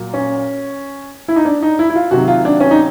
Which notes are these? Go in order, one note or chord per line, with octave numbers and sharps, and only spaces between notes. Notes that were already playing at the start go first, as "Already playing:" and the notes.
Already playing: A#2 F#3
C#4
E4
D#4
D4
D#4
E4
E4
F4
C3 D#3 F#3 F#4
F4
D4
C#4
D#4